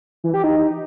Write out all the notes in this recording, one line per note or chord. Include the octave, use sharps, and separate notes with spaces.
E3
G4
D#4